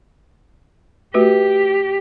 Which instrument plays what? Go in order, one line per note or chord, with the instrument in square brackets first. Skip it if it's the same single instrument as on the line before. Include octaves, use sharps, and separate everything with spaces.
[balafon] A3 F#4 B4 [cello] G4